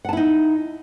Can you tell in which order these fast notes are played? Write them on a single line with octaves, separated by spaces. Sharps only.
F#5 A5 E4 D#4